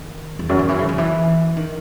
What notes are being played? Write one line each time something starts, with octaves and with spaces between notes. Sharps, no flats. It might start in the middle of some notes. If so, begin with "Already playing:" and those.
Already playing: D#3
E2
F#2
D#3
E3
C#3
D#3
E3
D#3